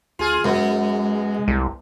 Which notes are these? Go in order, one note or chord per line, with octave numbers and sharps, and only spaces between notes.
D2 F4 G#4
F#2 G#3 B3
C2